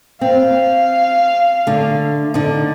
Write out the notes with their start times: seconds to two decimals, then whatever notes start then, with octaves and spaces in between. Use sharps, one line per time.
0.21 C4 F5
1.67 D3 A3
2.34 D3 D#4